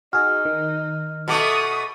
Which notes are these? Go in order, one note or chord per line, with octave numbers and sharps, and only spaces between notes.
D#4 F#4 G#4 F6
D#3
B2 A3 D6 D#6